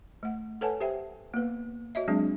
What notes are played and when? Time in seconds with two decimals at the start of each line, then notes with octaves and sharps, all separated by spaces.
0.23 A3 F#5
0.61 A4 B4 C#5 F#5 G#5 A5
0.80 G4 C5 E5 G5
1.34 A#3 B3 B4
1.95 F#4 C#5 D#5 E5
2.08 F#3 G#3 C4 D4 G#4